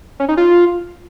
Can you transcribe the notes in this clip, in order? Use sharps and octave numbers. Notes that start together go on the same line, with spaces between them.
C#4
D#4
F4